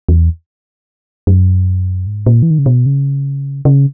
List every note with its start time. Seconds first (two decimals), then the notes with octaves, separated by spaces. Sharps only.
0.09 E2
1.27 F#2
2.07 G#2
2.26 A#2
2.43 E3
2.51 D#3
2.59 C#3
2.66 B2
2.86 C#3
3.65 C#3